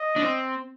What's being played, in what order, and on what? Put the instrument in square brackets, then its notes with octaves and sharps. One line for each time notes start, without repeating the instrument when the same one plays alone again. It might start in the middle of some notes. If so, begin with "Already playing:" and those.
Already playing: [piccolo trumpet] D#5
[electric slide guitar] D4
C4